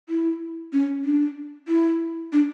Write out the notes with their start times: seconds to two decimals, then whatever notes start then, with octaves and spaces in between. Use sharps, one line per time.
0.09 E4
0.73 C#4
1.04 D4
1.68 E4
2.33 D4